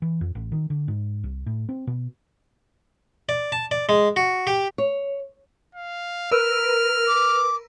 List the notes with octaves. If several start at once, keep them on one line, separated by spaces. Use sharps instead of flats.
E3
F2
A1
D#3
D3
G#2
C2
A2
C4
B2
D5
A5
D5
G#3
F#4
G4
C#5
F5
A#4 B4 E6 F6
D6